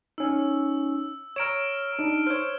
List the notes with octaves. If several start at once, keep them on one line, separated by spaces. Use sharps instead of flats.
C#4 D#4 E6
C#5 A#5 F6 D7 E7
D4 D#4
C5 C#5 F6